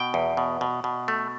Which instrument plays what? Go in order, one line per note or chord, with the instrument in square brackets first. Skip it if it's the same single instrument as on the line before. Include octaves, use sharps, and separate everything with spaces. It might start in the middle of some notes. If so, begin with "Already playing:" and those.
Already playing: [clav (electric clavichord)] B2 G5
E2
B2
B2
B2
A3